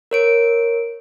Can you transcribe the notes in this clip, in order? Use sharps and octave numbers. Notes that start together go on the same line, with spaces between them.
A#4 C#5 D7